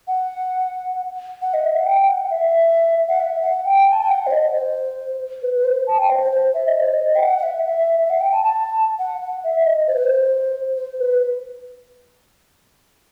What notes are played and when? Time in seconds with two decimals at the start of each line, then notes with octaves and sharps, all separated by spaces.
0.08 F#5
1.42 F#5
1.54 D#5
1.65 E5
1.75 F#5
1.86 G5
2.02 G5
2.08 F#5
2.30 E5
3.09 F#5
3.20 E5
3.42 F#5
3.65 G5
3.92 A5
4.00 G5
4.09 F#5
4.27 C5
4.31 D#5
4.54 C5
5.42 B4
5.56 B4
5.65 C5
5.87 A5
5.98 G5
6.09 C5
6.21 C5
6.32 C5
6.54 E5
6.67 D#5
6.80 C5
6.94 D#5
7.15 G5
7.21 F#5
7.39 F#5
7.43 E5
7.65 E5
8.06 E5
8.10 F#5
8.20 G5
8.32 A5
8.43 A5
8.99 F#5
9.21 F#5
9.44 E5
9.60 E5
9.66 D#5
9.87 C5
9.96 B4
10.03 C5
10.77 C5
10.99 B4